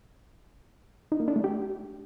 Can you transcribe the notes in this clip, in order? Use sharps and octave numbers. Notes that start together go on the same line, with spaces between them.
D#4
A#3
D4
A3
G4